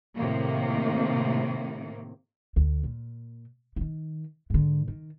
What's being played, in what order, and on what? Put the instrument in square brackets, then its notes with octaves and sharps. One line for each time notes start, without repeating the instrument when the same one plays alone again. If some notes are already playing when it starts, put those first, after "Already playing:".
[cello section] A2 C3 D#3 A#3
[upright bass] D2
A#2
D#3 E3
G#2 D3
D#3